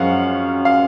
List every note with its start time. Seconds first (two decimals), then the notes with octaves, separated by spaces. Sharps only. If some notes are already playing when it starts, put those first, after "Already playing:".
Already playing: F#2 F3 G#3 C#4 F5 F#5
0.65 F5